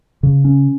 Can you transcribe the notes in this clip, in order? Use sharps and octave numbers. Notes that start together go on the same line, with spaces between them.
C#3
C#4